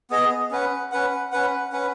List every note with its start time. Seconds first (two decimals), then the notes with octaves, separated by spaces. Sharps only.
0.10 B3 G#4 D#5
0.51 C#4 B4 F#5
0.92 C#4 B4 F#5
1.32 C#4 B4 F#5
1.72 C#4 B4 F#5